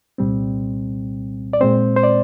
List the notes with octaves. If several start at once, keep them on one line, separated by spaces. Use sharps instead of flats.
C2 A#2 G3 C4
D5
A#2 G#3 C4 C5
C5
D5